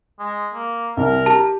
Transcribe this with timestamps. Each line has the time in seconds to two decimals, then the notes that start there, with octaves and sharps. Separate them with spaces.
0.19 G#3
0.54 A#3
0.97 C2 A#4
1.26 G4 A5